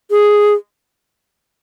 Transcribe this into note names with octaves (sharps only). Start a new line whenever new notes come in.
G#4